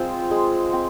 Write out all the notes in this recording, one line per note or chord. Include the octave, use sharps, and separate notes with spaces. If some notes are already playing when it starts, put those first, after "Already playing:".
Already playing: G#3 C4 F4 C5
G#3
C4